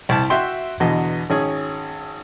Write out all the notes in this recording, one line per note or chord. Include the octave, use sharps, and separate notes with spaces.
C2 A5
F#4 E5 G5 C6
E2 B2 D3 D#5
G#1 C#4 G#4